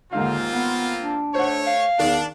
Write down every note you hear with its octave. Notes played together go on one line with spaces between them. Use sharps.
D#2 G#2 D3 A#3 C4 F4 F5
B3
D4
A3 C5 C#5 F#5
F5
E2 D#3 D4